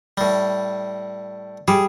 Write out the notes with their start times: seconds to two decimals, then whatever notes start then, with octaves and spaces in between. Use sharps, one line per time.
0.17 A2 G3
1.68 G3 G#4